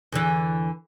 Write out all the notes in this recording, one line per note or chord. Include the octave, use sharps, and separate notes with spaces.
E2 D3 E3